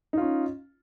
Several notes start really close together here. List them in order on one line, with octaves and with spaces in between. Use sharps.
D#4 F4 C#4